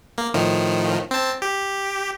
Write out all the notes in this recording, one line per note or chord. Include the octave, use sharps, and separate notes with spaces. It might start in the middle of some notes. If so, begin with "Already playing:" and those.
A#3
A2 D#3 F3
C4 A5
G4